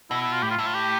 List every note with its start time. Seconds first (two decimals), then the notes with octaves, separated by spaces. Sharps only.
0.11 B2 E4
0.22 E4
0.32 F4
0.42 A2 G4
0.51 F4
0.58 A2 E4
0.67 F4
0.75 G4